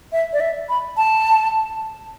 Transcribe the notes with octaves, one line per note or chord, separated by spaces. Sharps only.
E5
D5
E5
B5
A5